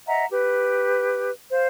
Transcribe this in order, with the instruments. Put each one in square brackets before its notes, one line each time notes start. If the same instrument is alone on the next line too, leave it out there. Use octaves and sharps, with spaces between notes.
[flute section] D#5 E5 F#5 A#5
G4 B4
C5 F5